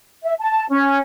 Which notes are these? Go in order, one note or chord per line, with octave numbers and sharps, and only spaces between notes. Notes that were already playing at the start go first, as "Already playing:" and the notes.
E5
A5
C#4